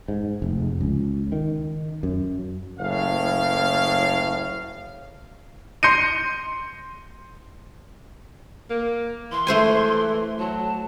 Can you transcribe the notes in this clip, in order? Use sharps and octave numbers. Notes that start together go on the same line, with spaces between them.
G#2
F1
C#2
D#3
F#2
F#1 A2 F5
C6 G6 A#6 C7 C#7 D#7
A#3
E3 C6
A3 C5 G#5
F#3 A5